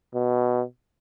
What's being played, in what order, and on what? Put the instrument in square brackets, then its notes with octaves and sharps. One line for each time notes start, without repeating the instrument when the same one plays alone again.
[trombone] B2